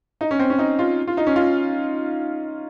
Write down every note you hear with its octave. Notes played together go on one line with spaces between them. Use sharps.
D#4
C#4
C4
C#4
D#4
F4
F4
D#4
C#4
F4